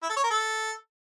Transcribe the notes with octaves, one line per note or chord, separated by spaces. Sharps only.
E4
A4
C#5
A#4
A4